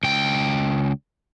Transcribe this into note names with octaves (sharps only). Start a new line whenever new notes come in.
C#2 G5